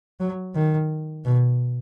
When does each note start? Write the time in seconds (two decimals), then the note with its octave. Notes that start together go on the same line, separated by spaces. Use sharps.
0.20 F#3
0.55 D#3
1.25 B2